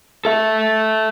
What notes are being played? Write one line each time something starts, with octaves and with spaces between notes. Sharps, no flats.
A4 E5